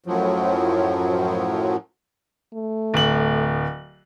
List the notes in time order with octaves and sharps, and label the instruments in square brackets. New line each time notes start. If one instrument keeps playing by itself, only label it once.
[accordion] F#2 A2 F3 F#3
[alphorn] A3
[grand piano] D1 F#7